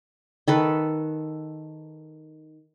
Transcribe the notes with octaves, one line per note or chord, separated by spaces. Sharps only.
D#3 A4 B4